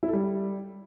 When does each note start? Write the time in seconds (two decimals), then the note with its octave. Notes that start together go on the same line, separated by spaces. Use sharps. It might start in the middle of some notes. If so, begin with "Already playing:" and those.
0.03 E4
0.08 A4
0.13 G3